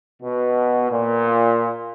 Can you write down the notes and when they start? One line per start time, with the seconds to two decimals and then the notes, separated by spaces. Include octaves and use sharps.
0.21 B2
0.90 A#2